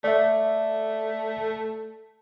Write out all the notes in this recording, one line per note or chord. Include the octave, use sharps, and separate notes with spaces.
A3 D5 E5